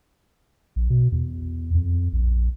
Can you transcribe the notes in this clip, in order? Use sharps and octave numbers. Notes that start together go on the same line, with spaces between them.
A#1
B2
E2
F2
A#1